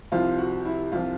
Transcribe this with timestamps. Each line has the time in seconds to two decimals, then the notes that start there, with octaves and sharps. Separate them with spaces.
0.12 C2 C3 F3 F4
0.38 F#4
0.65 E4
0.92 C2 C3 F3 F4